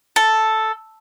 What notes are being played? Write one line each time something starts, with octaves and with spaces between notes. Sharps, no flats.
A4